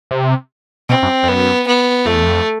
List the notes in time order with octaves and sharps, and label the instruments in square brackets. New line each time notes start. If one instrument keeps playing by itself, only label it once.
[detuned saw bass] C3
[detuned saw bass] B2 [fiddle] C4
[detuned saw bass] F#2
F2
[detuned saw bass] F#2 [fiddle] B3
[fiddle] B3
[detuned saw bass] F2 [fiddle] A3
[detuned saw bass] E2
F2